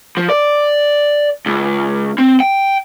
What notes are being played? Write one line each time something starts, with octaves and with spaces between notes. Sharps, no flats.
F3
D5
C#2
C4
G5